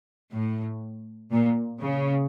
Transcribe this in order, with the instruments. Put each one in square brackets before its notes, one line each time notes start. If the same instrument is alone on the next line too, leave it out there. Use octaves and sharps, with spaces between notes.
[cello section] A2
A#2
C#3